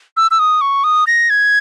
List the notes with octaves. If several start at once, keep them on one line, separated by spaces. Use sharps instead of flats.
E6
E6
D#6
C#6
D#6
A#6
G#6